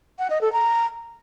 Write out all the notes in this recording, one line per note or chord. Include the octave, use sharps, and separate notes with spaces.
F#5
D#5
A4
A#5